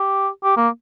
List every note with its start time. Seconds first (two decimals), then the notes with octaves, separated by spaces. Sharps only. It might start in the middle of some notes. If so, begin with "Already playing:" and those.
Already playing: G4
0.43 G4
0.57 A#3